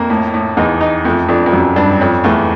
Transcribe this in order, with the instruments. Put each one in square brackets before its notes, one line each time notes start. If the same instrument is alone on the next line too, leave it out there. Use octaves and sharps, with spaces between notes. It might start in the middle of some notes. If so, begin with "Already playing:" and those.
Already playing: [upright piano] F2 [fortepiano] A#3
[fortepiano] A2
A2
[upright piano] E2 [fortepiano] D#4
[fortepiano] D#4
[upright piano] F2 [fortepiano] A3
[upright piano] F2 [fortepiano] D4
[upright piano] F2
[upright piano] F#2 [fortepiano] F#3
[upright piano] G2 [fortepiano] D4
[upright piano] F2 [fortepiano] C#4
[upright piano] E2 [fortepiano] A3